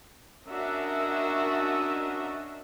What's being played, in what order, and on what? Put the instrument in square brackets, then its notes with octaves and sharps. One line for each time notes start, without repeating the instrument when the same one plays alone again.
[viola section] C#4 D4 F#4 A#4 D#5 E5